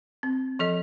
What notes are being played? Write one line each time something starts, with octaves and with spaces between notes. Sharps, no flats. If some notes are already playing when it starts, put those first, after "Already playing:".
C4
F3 A4 D#5